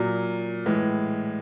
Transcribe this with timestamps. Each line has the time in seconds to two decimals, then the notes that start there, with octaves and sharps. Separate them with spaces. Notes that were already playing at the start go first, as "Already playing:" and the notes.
Already playing: A#2 F#3
0.66 A2 E3 G#3